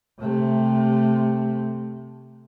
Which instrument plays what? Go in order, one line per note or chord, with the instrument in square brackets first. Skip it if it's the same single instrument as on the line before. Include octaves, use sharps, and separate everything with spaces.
[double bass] C3 A3